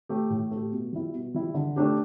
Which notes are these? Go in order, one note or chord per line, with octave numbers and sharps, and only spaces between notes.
A3 G4
A2
A3 G4
B2
G3 E4
B2
G3 E4
D3
A3 D4 G4